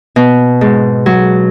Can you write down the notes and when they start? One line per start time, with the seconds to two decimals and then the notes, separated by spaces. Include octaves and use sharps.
0.16 B2
0.61 G#2
1.06 F#3